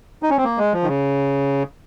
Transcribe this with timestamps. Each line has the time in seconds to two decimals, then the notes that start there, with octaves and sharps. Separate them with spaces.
0.23 D#4
0.30 C#4
0.37 C4
0.44 A#3
0.58 G#3
0.73 F3
0.83 D#3
0.87 C#3